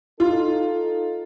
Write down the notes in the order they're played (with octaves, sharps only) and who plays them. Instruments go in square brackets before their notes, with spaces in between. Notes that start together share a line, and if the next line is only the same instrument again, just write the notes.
[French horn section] D#4 A4 [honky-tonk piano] F4